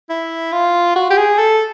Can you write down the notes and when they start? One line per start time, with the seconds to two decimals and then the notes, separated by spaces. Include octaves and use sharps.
0.10 E4
0.53 F4
0.96 F#4
1.10 G4
1.17 G#4
1.39 A4